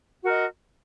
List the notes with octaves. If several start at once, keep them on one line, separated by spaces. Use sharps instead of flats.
F#4 A#4 D#5